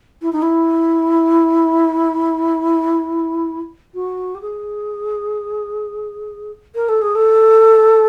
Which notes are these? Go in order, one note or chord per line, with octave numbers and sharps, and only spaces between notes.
E4
D#4
E4
F#4
G4
G#4
A#4
A4
G#4
A4